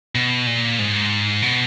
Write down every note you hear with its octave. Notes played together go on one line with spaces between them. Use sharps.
B2
A#2
G#2
B2